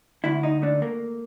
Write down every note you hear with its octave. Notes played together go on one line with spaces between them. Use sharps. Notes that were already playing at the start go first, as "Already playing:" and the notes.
D2 E4
D#4
A3 D4
A#3